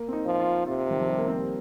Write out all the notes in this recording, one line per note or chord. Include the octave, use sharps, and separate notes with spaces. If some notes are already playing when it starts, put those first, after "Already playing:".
Already playing: A#3
C4
D#4
F3
F4
C3 F4
D#3
F3
G3
A#3
C4